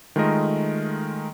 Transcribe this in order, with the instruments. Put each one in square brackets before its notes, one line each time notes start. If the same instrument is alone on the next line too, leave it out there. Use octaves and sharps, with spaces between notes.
[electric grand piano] D#3 G#3 A3 F4 A#4 D#5